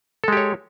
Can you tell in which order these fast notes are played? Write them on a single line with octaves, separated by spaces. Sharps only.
A4 G#3 G4 C#5